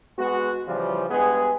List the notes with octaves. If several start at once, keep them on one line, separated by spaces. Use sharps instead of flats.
G#3 B3 F#4
C#3 E3 F3 G3 F4
G2 G#3 B3 G#4